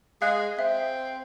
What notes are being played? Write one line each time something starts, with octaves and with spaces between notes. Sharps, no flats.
G#3 F5 F#6
C4 E5